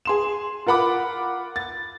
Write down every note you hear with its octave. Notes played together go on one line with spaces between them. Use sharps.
G#4 C6 E7
F4 A#4 F#5 B5 D6
A6